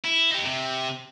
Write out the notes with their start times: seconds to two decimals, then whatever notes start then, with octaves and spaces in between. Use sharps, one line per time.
0.05 E4
0.31 D#4 G4
0.45 C3